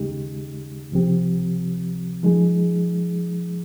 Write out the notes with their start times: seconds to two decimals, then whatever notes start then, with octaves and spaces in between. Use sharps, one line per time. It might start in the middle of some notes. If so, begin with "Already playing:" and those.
Already playing: D#2 C#3 G#3 D#4 G4
0.92 C#2 C3 F3 C4 G4
2.23 F3 G#3 D#4 G#4